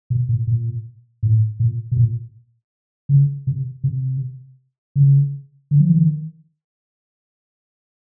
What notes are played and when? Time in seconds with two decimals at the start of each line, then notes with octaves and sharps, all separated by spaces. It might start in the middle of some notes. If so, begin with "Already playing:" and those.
0.10 B2
0.29 A#2
0.47 A#2
1.23 A2
1.60 A#2
1.92 B2
1.97 A#2
3.09 C#3
3.47 C3
3.84 C3
4.96 C#3
5.71 D3
5.80 F3
5.89 E3
5.98 D#3